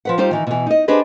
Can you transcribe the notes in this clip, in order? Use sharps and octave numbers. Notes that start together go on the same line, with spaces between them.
F3 B4 F#5
G3 D#4 F4 G4 C5
D#3 E3 D#4
B2 E3
D#4 D#5
D4 G4 G#4 B4 C5 D#5